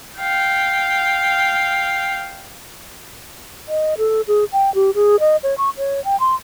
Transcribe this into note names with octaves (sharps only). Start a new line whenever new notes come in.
F5 G5
D#5
A4
G#4
G5
G4
G#4
D#5
C#5
C#6
C#5
G5
C6